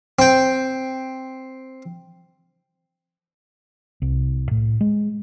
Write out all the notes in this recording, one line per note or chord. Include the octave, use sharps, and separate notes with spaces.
C4 G5
C2
A2
G#3